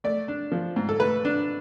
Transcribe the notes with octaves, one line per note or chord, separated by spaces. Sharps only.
A3 D5
D4
F3
G#2
A4
A3 B4
D4